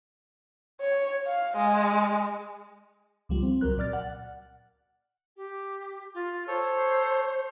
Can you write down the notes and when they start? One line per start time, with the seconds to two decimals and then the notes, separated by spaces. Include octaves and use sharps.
0.80 C#5
1.27 F5
1.57 G#3
3.29 C#2 F3 G3
3.43 C4
3.61 C#2 F#3 A#4 F#6
3.78 A#2 D5 F6 A6
3.93 F#5
5.36 G4
6.14 F4
6.48 A4 C5 C#5